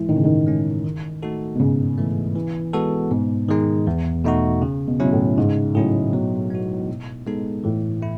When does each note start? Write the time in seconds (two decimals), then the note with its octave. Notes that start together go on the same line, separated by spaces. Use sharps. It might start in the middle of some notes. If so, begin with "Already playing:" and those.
Already playing: E3 G#3
0.09 A2 D#3
0.16 C#3
0.24 D#3
0.47 G#3 C#4
0.84 D#3
1.23 A3 D#4 F#4 A4
1.55 B2
1.60 G#2 C#3
1.98 E3 A3
2.35 E3
2.73 G#3 B3 F#4 A4
3.11 G#2 B2
3.48 D#3 G#3 D#4
3.87 E2
4.24 B2 A3 D#4 F#4
4.62 C#3
4.88 B2
5.00 B2 F#3 C#4 E4
5.13 A2
5.37 G#2 C#3
5.75 A2 F#3 C#4 E4 G#4
6.13 B2 F#3
6.50 B3 F#4
6.88 B2
7.27 G#3 B3 D#4 A4
7.64 A2 E3
8.02 A3 E4